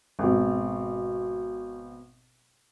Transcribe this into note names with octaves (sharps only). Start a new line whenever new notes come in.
G#1 B2